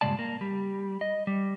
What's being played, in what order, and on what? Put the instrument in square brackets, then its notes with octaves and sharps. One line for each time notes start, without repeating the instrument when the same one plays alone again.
[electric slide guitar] G2 A#2 C#3 G#3 D5 A5
A#3
G3
D#5
G3